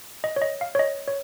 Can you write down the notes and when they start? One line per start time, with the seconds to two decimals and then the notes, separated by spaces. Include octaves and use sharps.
0.24 D#5
0.36 C#5
0.42 D#5
0.61 F5
0.75 C#5
0.79 D#5
1.08 C#5